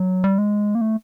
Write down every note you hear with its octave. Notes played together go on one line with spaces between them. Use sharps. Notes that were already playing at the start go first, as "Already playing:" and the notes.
Already playing: F#3
G3
G#3
A#3
A3